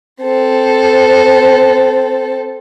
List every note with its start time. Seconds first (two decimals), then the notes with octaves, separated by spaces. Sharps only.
0.22 C4 A4